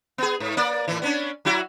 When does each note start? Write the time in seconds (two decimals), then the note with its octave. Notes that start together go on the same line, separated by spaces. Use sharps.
0.18 B3 G#4
0.40 G#2
0.57 A#3 D5
0.88 A2 E3
1.02 B3 C#4 D4
1.45 F#3 E4 F#4